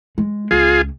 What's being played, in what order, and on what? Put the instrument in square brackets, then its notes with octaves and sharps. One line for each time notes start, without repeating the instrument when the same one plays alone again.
[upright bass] G#3
[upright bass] C#2 [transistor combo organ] F4 G#4